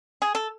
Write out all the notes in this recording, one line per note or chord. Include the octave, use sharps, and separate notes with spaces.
G#4
A4